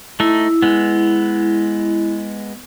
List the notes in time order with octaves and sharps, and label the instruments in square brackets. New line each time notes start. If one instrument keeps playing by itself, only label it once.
[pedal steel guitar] A3 D#4 [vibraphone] E4
[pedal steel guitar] G#3 B3